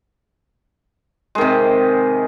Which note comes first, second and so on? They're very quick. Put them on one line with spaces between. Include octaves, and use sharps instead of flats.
G#3 D#3 C3